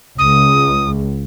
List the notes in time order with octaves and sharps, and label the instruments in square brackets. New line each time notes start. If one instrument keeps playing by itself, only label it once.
[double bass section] C#2 [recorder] D#6